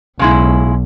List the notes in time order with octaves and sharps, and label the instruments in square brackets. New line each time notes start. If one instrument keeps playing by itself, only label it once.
[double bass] B1 [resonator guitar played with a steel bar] C#3 G#3 E4